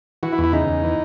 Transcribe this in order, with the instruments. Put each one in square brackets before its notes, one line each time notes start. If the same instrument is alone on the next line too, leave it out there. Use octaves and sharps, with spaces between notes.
[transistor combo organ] E3 F#4
E4
E2
E4
C#3 D#4
E2
E3